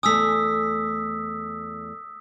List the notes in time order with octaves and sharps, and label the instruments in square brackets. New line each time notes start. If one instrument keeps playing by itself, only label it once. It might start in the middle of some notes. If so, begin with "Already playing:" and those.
[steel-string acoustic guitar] E2 A3 G#5 [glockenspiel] D#6 E6 B6